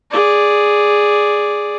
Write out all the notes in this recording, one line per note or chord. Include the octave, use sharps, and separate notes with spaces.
G#4 D5